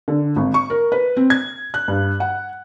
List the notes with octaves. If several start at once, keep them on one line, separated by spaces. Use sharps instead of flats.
D3
G#1
C#6
A#4
B4
C4
G#6
F#6
G2
F#5